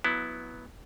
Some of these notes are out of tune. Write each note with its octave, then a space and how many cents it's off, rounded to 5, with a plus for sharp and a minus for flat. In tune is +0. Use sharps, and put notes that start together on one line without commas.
F#3 -10 B3 +0 E4 +0